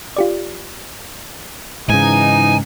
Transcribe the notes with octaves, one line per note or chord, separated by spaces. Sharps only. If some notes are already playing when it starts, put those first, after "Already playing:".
F4 G4 D5
G#2 C#3 E3 D#4 G#5